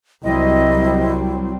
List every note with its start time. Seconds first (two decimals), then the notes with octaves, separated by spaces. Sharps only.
0.24 C2 F#3 G3 C4 E4 D#5